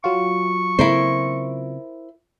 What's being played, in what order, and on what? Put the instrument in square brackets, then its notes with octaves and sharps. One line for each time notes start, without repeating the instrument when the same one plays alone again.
[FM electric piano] F#3 F4 [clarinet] C#6
[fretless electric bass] C#3 A#3 C4 [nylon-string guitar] E4 A#4 C5